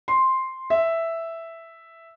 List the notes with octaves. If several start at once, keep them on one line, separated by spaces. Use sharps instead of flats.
C6
E5